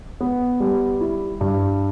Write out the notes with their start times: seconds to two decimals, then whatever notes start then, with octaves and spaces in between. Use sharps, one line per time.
0.21 B3
0.60 G3
1.01 E4
1.41 G2